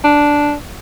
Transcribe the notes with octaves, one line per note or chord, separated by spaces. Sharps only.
D4